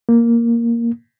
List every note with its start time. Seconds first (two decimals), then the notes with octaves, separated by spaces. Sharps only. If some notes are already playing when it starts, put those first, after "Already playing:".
0.09 A#3